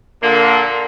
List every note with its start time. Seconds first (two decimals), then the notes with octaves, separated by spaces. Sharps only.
0.22 A#2 D3 A#3